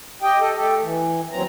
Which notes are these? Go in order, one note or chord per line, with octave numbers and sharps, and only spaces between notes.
G4 D#5 G5
A4 D#5
A3 G4 A4
E3
D#2 F#3 C4 A#5